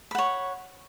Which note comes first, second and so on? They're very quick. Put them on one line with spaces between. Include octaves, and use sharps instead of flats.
B5 F#5 C#5